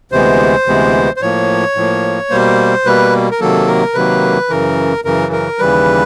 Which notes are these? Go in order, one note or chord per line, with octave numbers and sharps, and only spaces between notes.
D2 C3 E3 G#3 B3 C5
D2 C3 E3 G#3 B3
C5
A2 F3 A#3 C#5
A2 F3 A#3
B2 G3 A#3 C5
B2 G3 A#3 B4
A#4
C3 D#3 F#3 A#3 A4
A#4
C3 D#3 F#3 A#3 B4
F#2 C#3 E3 A#4
F#2 C#3 E3 A#4
A#4
D#2 C#3 E3 G3 B4